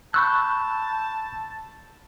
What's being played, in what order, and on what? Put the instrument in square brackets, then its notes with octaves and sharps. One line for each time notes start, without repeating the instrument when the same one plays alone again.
[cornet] A5 [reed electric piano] B5 C#6 E6 [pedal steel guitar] F#6 G6